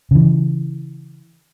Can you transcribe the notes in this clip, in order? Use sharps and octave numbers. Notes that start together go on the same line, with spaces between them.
C#3 E3